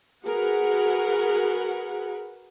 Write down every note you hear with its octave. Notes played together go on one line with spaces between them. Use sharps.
F#4 G#4 A#4 B4 F#5